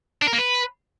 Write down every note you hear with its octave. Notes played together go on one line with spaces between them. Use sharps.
D4
A#4
A#3
B4